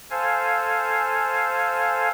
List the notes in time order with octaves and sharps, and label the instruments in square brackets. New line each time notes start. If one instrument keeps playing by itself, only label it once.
[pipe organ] A4 C5 F5 G#5